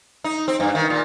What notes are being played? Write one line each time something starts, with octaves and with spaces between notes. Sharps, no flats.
D#4
C4
G2
D#3
A#2